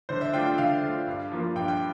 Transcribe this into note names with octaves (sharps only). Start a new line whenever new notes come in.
D3 C5
E5
A3 D4 F4 G5
G5
D3 F5
A3 D4 F4
G2
F3 A#3 F4
G2 G5
G5